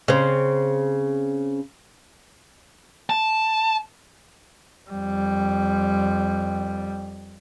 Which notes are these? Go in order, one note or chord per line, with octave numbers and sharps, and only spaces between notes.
C#3 C4
A5
F2 G3